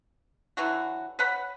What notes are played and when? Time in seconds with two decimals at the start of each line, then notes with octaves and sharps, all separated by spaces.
0.57 D3 E3 F#3 F#4
1.19 B4 C#5 F#5 B5